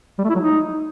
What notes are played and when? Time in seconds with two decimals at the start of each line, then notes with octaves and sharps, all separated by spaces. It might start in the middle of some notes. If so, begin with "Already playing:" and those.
0.19 G3
0.24 A3
0.30 E4
0.35 F#3
0.41 D#4